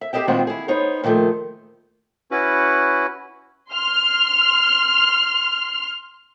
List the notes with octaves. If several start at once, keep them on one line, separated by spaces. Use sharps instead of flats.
E5
G4 G#4 C5 D#5 E5 G5
A#2 D#3 G#3 B3 C4 F#4
E4 G#4
B3 D#4 C5 C#5
A#2 D#3 F3 A3
C#4 E4 F#4 B4
C6 F6